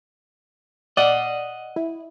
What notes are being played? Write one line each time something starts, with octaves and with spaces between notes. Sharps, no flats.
D5 D#5 F#5
E4